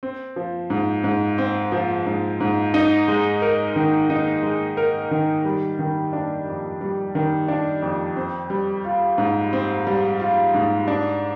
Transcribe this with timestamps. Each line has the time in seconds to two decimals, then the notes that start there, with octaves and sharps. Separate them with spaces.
0.03 C4
0.36 F3
0.70 G#2
1.04 G#2
1.38 C4
1.72 F3
2.06 G#2
2.40 G#2
2.74 D#4
3.08 G#3
3.42 A#4
3.76 D#3
4.10 D#4
4.43 G#3
4.77 A#4
5.11 D#3
5.45 G3
5.79 D#3
6.13 D4
6.47 F2
6.81 G3
7.15 D#3
7.48 D4
7.82 F2
8.16 C4
8.50 G3
8.84 F4
9.18 G#2
9.53 C4
9.87 G3
10.20 F4
10.54 G#2
10.88 D4